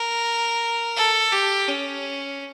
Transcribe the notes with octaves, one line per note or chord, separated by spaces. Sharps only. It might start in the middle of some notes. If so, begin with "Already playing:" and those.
Already playing: A#4
A4
G4
C#4